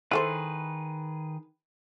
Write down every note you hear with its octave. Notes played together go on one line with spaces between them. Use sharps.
D#3 E4 G#4 A4 B4 C5